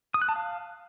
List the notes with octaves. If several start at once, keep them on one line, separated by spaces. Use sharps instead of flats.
D#6
F#6
A5
F5